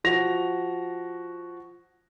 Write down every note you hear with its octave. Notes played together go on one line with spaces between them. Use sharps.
F3 F#4 A#6 F7